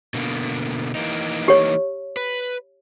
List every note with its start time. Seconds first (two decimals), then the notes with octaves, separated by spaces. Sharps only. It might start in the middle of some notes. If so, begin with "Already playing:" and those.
0.14 B2 D3 A#3
0.95 E3 A#3 D#4
1.48 G4 C#5
2.17 B4